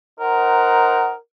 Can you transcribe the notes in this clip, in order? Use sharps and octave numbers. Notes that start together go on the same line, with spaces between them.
D#4 A#4 C5 F#5